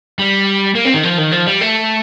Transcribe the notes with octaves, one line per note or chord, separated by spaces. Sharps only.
G3
A#3
C4
D#3
F3
D#3
F3
G3
A3